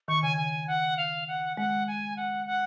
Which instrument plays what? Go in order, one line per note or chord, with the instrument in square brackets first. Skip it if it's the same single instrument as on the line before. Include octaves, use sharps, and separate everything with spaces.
[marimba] D#3 [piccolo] C#6
[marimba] C#3 [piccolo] G#5
[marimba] C#3 [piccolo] G#5
[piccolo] F#5
F5
F#5
[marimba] G#3 [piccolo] F#5
[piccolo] G#5
F#5
F#5